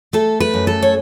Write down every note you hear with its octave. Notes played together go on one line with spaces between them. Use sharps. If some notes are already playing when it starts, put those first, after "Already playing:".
A3 A4
B4
F#2
A4
C#5